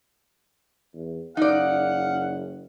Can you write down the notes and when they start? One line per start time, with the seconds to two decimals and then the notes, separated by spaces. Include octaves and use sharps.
0.94 E2
1.37 F#1 D#4 D5 F5 F#5